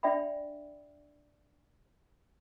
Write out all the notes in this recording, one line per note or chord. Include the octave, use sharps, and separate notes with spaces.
D4 D5 E5 G5 B5